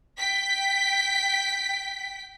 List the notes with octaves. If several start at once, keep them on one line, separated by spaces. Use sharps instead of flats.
G5 B6